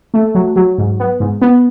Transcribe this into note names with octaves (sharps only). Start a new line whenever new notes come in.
A3
F#3
F#3
G#2
B3
G#2
B3